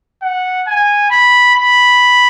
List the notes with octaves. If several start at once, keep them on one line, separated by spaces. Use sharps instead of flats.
F#5
G#5
B5
B5